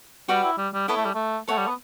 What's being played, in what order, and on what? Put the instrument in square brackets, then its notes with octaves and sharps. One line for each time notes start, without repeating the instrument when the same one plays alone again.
[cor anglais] G3 [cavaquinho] F#4 B4 D5 G5
[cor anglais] E4
G3
G3
[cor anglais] B3 [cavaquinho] E4 A4 C#5 E5
[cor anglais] A3
G3
A3
[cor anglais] A3 [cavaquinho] A4 C#5 F#5 A5
[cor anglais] G3
B3